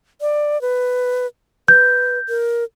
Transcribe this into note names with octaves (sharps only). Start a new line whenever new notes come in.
D5
B4
B4 G6
A#4